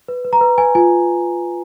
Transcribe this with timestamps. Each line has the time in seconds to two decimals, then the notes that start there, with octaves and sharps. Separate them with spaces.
0.08 B4
0.25 B4
0.33 A#5
0.41 B4
0.58 B4 G#5
0.75 F4 G#5